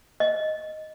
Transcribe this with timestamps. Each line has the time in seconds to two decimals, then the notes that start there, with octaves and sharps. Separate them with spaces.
0.20 D#5